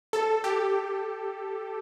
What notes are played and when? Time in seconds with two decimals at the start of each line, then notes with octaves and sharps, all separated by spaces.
0.13 A4
0.44 G4